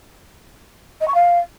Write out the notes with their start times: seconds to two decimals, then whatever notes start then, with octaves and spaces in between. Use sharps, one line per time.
1.01 D#5
1.08 C#6
1.14 F5